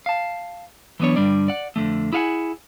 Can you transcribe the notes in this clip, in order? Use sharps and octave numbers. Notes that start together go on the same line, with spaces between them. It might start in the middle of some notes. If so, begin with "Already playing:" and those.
F5 A5
E3 F#3 B3 D4 C#5
G2 D3 G3 D4 D5
D5 F#5
F2 D3 E3 A3
E4 G#4 F5 F#5 G#5